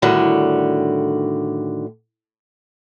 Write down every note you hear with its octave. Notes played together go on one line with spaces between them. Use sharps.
A2 D3 D#3 G3 F#4